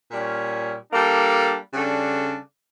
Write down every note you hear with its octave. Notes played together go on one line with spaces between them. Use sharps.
A#2 G3 C#4
G3 A#3 D4 A4
C#3 G3 D4 A4